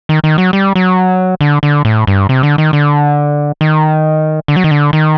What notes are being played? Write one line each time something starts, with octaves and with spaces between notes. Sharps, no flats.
D#3
D#3
F#3
G3
F#3
D3
D3
A2
G2
C3
D3
D#3
D3
D#3
D3
F#3
D#3
D3
D#3